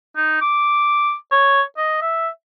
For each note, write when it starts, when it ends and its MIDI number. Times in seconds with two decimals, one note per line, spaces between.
0.16 0.40 63
0.41 1.14 86
1.32 1.62 73
1.77 2.00 75
2.02 2.28 76